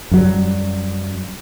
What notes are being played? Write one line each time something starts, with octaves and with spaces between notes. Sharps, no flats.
F#2 F#3 G3